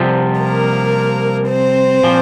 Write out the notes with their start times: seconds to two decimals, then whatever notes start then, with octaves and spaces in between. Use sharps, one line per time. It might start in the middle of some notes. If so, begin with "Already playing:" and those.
Already playing: C2 C3 F3
0.39 A#3 A#4
1.47 C4 C5
2.03 A#2 F3